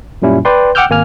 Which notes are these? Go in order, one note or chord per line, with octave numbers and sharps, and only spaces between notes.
F#2 A#2 G3 C#4 E4
B4 D5 G5 C6
F#5 G5 D6 E6 F6 G6
G#1 A#3 G#5 F6